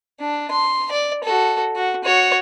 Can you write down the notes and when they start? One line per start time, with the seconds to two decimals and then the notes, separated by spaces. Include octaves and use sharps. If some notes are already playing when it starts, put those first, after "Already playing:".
0.20 D4
0.51 C6
0.92 D5
1.24 F#4 A4
1.76 F#4
2.04 F#4 C#5